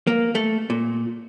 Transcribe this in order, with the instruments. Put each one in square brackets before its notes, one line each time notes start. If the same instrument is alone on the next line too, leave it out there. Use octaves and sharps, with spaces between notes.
[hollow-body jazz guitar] A#3
A3
A#2